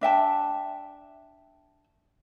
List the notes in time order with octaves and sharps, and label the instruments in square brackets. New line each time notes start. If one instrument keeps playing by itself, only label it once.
[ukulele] D4 E5 G5 A5